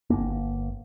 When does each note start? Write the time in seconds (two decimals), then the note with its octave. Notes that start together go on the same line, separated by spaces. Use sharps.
0.10 G1 G2 A#3